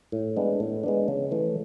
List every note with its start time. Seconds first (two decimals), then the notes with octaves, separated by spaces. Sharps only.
0.12 A2
0.36 G#3 B3 D4
0.60 A2
0.83 G#3 B3 D4
1.08 C#3
1.31 E3 A3